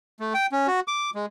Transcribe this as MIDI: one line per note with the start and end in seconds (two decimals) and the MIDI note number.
0.20 0.33 57
0.34 0.46 79
0.52 0.67 61
0.67 0.80 66
0.88 1.10 86
1.15 1.26 56